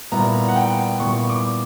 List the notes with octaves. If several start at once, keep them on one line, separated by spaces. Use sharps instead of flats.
A#2 G3 B3 E4 A#5
F#5
G5
A#2 G3 B3 E4 C#6
D6